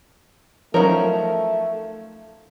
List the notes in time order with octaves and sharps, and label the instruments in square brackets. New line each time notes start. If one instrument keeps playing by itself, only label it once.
[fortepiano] F3 C#4 D#4 [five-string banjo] F#3 A#4 [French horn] A3